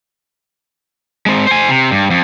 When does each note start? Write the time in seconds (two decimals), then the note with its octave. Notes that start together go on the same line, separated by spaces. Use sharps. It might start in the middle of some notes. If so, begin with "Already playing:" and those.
1.26 G#3 C4
1.47 C5 G#5
1.69 C3
1.91 G2
2.11 F2